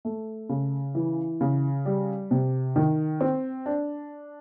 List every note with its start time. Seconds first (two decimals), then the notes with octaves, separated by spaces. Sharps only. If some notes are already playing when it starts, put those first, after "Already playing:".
0.05 A3
0.49 C#3
0.95 E3
1.41 C#3
1.86 G3
2.31 C3
2.76 D#3
3.21 C4
3.66 D4